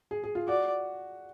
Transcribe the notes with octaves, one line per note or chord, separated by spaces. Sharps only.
G#4
G#4
F4
F#4 D5